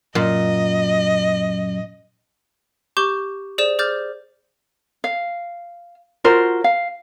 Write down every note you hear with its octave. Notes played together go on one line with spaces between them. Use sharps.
F#2 A#2 D#5
G4 C#6 D6 G6 G7
G#4 C5 D5 E7
G#4 C5 D6 F6 G6 A6
F5
F4 F#4 A#4 C5
F5